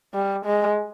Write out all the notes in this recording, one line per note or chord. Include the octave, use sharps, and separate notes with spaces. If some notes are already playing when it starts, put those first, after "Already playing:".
G3
G#3